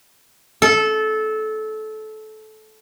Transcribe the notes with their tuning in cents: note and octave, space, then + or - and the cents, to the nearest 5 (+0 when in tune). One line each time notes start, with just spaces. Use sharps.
A4 -20